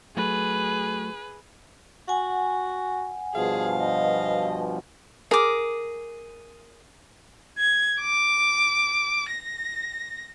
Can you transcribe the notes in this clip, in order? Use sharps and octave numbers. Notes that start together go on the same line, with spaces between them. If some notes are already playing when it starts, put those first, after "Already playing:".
F#3 A3 G#4 B4
F#4 F#5 G#5
G2 B2 F3 G#4 F5
D#5
G#4 A#4 D6
G#6
D6
A#6